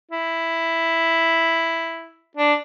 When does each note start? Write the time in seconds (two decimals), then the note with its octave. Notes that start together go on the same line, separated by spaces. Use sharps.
0.11 E4
2.37 D4